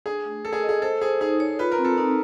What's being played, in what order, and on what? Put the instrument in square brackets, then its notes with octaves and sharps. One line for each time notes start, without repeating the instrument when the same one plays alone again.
[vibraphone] D4 [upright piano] G#4
[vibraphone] A3
[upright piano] A4 [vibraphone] A#4
[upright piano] G#4
[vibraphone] D#5
[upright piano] G#4
[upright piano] A4 [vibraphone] C5
[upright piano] G#4 [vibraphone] C5
[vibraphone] D#4 [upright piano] G#4
[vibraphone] C#5
[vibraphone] F4 [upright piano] B4
[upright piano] A#4
[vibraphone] C4
[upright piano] A4
[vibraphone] D#4 [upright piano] A#4